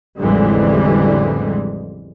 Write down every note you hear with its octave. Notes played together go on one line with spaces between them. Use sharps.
A1 F2 D3 E3 G3 G#3